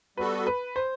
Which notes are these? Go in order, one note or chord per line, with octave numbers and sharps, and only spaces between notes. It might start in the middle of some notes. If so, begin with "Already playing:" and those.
G3 B3 F#4 A4 B4
B4
C5